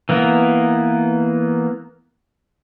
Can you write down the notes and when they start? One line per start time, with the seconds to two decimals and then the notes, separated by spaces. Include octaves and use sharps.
0.09 E3 A#3 B3 A#4